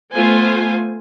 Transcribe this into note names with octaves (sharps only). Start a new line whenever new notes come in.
A3 B3 F4 C5 G#5